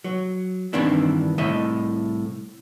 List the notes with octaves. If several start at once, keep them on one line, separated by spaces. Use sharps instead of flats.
F#3
G2 D#3 E3 C4 D4 E4
C2 A2 D#5 E5